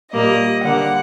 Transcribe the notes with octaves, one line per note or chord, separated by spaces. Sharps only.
A#2 G3 A#3 D#5
D3 G3 A#3 F#5